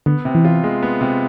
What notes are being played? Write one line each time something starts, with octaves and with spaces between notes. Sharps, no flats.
D3 B3
C3
E3
F4
G#3
B3
C3